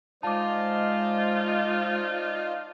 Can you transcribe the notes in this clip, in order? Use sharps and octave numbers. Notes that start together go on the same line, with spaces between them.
G#3 D#4 F4 C5 D5 D#5 A5 D6